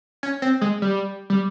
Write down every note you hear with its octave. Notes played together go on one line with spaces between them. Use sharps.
C#4
C4
G#3
G3
G3